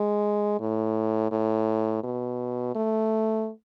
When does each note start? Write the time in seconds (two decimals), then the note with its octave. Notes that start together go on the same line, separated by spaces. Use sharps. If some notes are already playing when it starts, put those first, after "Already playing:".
Already playing: G#3
0.60 A2
1.32 A2
2.04 B2
2.75 A3